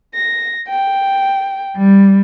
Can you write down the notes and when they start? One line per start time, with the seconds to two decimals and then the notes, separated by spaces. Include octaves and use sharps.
0.14 A#6
0.68 G5
1.76 G3